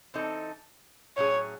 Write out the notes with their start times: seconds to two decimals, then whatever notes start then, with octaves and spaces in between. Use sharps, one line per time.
0.14 E3 C4 D#4 A4
1.17 A2 F#3 C#4 G#4 C#5